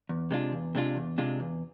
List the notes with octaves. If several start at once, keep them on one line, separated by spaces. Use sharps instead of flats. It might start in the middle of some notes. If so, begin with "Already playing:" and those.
E2
C3 G#3 D4 F4
E2
C3 G#3 D4 F4
E2
C3 G#3 D4 F4
E2